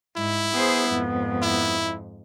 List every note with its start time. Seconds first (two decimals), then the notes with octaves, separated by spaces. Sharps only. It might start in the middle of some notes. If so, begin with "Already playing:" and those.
0.17 G#2 E4
0.54 B3 G#4 C5
0.89 F2 G#2
1.43 E4